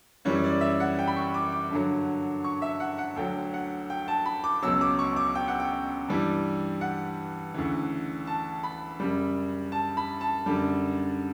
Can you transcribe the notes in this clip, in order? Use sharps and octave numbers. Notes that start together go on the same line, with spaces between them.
F#2 E3 G3 C#5
D5
E5
F#5
G5
B5
C#6
D6
D6
G2 D3 F#3
C#6
E5
F#5
F#5
D2 D3 F#3 G5
F#5
G5
A5
B5
D6
C#2 B2 F#3 E6
D6
C#6
D6
G5
F#5
G5
G2 E3 G3
F#5
D2 C#3 E3
A5
B5
F#2 C#3 G3
A5
B5
A5
F#2 D3 G3